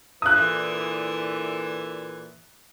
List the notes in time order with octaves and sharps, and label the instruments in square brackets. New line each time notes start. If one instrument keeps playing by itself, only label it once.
[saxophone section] C#3 E3 F3 [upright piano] D#6 F#6
[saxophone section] A#2 D3 E3